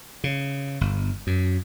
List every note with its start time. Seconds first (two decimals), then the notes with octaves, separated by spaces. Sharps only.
0.24 C#3
0.81 G1
1.27 F#2